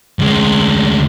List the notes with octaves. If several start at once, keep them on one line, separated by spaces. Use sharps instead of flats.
D2 G#3